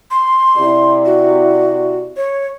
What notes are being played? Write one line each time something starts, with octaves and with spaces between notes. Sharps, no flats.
C6
C3 E4 D5
F#4
C#5